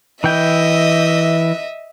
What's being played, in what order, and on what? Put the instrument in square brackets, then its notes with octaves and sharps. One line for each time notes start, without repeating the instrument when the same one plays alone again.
[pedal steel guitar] E3 G5 [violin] D#5 E5